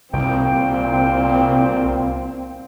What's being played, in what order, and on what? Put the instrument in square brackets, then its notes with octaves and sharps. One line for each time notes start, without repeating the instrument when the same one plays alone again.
[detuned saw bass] C2 [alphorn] A#2 [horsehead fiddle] C4 [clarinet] G5